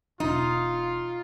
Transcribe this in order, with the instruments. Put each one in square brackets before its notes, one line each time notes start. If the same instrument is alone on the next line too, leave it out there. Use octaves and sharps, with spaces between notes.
[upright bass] E1 [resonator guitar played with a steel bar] D#4 [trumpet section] F4